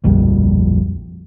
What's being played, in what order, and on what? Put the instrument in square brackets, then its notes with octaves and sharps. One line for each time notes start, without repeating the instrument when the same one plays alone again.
[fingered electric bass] D1 A#1 F2 G3